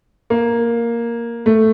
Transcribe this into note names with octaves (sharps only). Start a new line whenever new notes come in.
A#3
A3